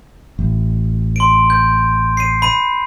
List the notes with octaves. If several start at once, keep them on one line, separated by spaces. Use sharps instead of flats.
A1
C6 D7
G6
C7 D#7
B5 D#7